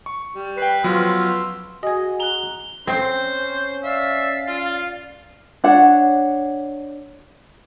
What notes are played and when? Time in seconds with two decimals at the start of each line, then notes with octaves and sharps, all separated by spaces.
0.06 C#6
0.35 G3
0.58 B4 G5 C7
0.84 F3 F#3 B3 F5 C6 E6
1.83 F#4 G#4 D#5 G#5
2.20 A#5 F#6 F7 G7
2.87 C4 C#4 C5
3.84 D5 E5 F5
4.48 F4
5.64 D4 C#5 F#5